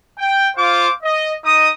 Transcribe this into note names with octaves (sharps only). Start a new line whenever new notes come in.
G5
F4 C5 F5 D6
D#5
D#4 D#5 D#6